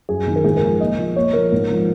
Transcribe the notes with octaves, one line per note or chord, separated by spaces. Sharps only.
F#2 G#4
D#3
A#4
G#2 G#4
A#4
F3
A#2 D#5
F3
A#2 C#5
F3 A#4
G#2
F3